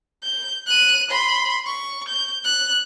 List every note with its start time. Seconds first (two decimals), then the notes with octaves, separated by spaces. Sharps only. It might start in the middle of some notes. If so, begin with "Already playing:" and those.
0.23 G6
0.67 F#6 D#7
1.11 B5 C6
1.66 C#6
2.08 G6
2.45 F#6